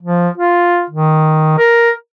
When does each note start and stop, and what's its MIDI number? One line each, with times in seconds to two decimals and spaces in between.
0.03 0.29 53
0.38 0.84 65
0.90 1.58 51
1.58 1.91 70